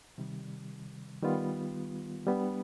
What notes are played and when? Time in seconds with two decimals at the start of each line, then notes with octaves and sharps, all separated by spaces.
0.18 C3 D#3 G3
1.22 D#3 G3 B3 F4
2.27 G3 B3 D4